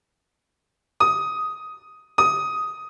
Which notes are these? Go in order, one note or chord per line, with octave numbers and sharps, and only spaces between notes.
D#6
D#6